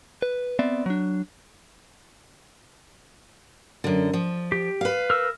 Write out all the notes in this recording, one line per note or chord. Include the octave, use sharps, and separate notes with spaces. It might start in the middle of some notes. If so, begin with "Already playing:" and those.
B4
B3 C4 D5 E5
F#3 D4
F#2 D3
F3
G4
B4 F5
A#4 E6